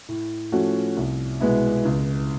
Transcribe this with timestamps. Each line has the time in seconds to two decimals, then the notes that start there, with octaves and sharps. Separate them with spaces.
0.08 A2
0.52 F3 A3 C#4 F#4
0.97 C2
1.40 B2 G#3 B3 E4
1.85 C#2